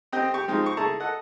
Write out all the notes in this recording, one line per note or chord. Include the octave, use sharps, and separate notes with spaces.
C4 G4 D#5 G5
G4 C#6
F3 G#3 C4 D#4 F4 G4
C5 C#6
E4 G#4 A4 A5 A#5 C#6
A4 D#5 F#5